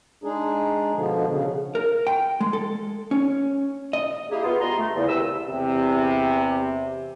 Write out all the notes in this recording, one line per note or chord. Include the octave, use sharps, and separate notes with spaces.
G#3 D4 D#4 G#4
B2 D3 F3
C#3
A#4
G5
G#3
A4
C#4
D#5
A#3 D4 E4 G4 G#4
B3 F4
G2 D3 G#3 D#5 A#5 C6
A3
E2 C#3
C2 C3 G3 A#4 B4 E6
E2 C3